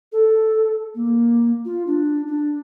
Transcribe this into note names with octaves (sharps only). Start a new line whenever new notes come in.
A4
A#3
F4
D4
D4